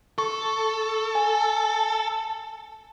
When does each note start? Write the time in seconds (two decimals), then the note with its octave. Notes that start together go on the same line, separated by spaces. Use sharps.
0.18 A4 C#6
1.15 G#5